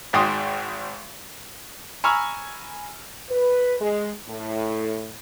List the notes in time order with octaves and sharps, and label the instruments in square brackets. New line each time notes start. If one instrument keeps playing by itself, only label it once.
[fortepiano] G#1 G#2 F#4 G5 C6 D#6
[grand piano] G#5 A#5 B5 C#6 E6 F6
[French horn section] B4
G#3
A2